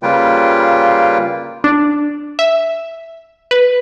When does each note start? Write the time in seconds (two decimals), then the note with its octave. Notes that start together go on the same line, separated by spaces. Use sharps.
0.03 C#3 G3 A#3 F4 B4 G5
1.64 D4
2.39 E5
3.51 B4